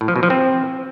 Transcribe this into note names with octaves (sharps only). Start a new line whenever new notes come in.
A2
F3
B2
F3
C4